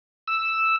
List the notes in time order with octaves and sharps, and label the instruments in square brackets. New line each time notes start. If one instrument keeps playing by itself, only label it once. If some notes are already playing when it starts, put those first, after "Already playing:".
[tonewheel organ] E6